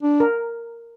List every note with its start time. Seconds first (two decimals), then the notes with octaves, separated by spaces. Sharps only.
0.03 D4
0.20 A#4